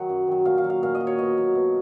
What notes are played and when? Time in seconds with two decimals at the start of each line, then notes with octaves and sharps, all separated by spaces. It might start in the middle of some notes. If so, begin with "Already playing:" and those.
Already playing: D#3 F#3 F#5
0.09 F#2
0.27 D#3 F#3
0.45 A#2 F5
0.58 F5
0.64 F#3
0.70 F5
0.83 A#2 F5
0.95 D#5
1.00 F#3
1.07 C#5
1.18 B2 D#5
1.37 F#3
1.55 B2